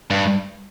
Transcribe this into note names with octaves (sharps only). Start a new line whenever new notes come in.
G2